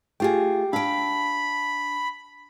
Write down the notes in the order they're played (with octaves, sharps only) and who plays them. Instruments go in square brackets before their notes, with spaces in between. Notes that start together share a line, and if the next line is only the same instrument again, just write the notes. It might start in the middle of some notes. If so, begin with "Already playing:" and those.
[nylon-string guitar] A3 F4 G#4 [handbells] G4 G5
[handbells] D4 [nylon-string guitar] F5 G5 [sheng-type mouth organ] B5